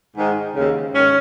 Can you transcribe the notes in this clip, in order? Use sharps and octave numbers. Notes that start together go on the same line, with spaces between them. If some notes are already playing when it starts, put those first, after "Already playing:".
G#2 D#3
D#2 C#3
G#2 D#3 C#4